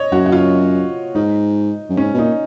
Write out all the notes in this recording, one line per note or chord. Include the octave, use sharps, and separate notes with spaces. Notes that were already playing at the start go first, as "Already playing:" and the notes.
Already playing: C#5 D#5
F#2 F#4
F#4
F4
G#2 D#4
F#2
G#2 C#4
B2
A#2 D#4